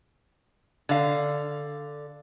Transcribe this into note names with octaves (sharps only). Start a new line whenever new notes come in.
D3 F5